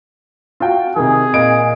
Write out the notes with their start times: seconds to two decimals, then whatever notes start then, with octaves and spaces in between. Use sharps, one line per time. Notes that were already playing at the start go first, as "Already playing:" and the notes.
0.60 F4 F#4 G5
0.96 C3 D#3 G#4
1.34 A#2 D#5 D7